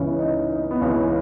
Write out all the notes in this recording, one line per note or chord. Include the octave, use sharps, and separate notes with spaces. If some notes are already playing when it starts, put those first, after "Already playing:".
Already playing: C#2 C#3 E3 B3 C#4
D#4
D#4
B3
C#2 C#3 E3 C#4